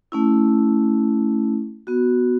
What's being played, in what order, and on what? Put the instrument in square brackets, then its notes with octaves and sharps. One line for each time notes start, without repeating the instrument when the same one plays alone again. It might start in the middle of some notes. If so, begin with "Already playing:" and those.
[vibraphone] A3 C#4 E4
B3 F#4